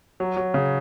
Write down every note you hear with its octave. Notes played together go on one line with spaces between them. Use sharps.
F#3
F#3
C#3